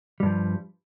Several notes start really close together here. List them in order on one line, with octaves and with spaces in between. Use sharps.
G3 G2 F3